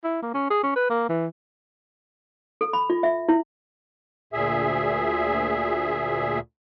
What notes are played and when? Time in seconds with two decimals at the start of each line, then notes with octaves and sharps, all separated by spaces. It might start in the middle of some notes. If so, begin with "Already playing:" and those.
0.04 E4
0.22 A#3
0.34 C#4
0.50 G#4
0.63 C#4
0.76 B4
0.90 A#3
1.09 E3
2.61 A4
2.73 B5
2.90 F4
3.03 E5
3.29 E4
4.33 D2 A#2 G#4 E5